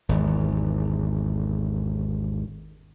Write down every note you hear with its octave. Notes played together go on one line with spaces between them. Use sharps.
G#1 E2